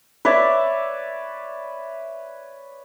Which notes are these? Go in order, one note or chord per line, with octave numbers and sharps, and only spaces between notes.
B4 C#5 D5 E5